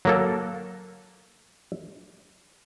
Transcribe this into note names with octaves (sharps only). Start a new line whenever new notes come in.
F#3 A#3 A4